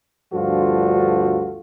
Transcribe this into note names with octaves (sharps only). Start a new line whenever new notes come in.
D2 G2 F3 F4 F#4 A4